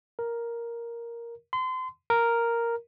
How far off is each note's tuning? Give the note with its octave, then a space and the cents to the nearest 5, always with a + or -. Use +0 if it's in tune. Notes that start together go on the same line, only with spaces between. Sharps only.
A#4 +5
C6 -30
A#4 +0